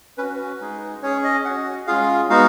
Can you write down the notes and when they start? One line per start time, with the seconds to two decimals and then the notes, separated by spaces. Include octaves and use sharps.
0.18 C#4 F#4 B4
0.61 G#3 D#4 G#4
1.03 C#4 G#4 C#5
1.24 D#5
1.45 C#4 F#4 F#5
1.87 G#3 C#4 F4 G#4 F5
2.29 G#3 B3 D#4 F#4 F5